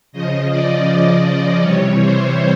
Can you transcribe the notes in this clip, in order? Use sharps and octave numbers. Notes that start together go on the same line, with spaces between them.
C#3 F3 D#5
D5
D5
C3 E3 G3 C#5
C5